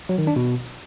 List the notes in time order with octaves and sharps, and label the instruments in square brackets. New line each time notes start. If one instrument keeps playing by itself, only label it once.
[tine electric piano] F#3
D#3
D4
B2